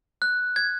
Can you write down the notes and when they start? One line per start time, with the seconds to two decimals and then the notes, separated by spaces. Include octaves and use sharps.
0.22 F#6
0.56 G#6